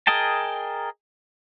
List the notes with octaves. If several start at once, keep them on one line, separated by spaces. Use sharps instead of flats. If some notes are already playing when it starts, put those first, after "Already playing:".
G#4 A#4 D#5 G5 A5